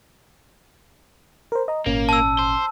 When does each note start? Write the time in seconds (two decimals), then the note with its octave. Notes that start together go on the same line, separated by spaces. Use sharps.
1.52 A#4 C5
1.68 D#5 A#5
1.86 G#1 A#2 A#3 C#4
2.09 A5 E6
2.39 C5